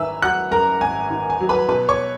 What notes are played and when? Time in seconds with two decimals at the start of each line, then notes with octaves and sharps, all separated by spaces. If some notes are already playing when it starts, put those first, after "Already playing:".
Already playing: G#1 F#2 D#3 B4 E5 G#5 A#5 E6
0.22 F#3 F#5 F#6
0.51 F#2 A#4 A#5
0.81 G#1 G#5
1.10 D#3
1.30 G#5
1.40 F#3
1.49 B4 B5
1.69 B2 B4 B5
1.89 C#5 C#6